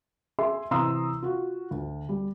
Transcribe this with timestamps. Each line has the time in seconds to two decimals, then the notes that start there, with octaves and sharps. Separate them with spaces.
0.39 G#4 E5 C6
0.71 C3 E3 A#5 C6 D#6 E6
1.22 F4 F#4
1.71 D2
2.09 G3